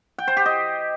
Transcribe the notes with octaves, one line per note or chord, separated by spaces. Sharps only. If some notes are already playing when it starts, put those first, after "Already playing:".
G5
C5
G4
D#5